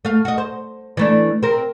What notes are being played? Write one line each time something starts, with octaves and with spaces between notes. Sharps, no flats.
A3 F5
F#4 D#5
C5
E3 A3 D4
C4 A#4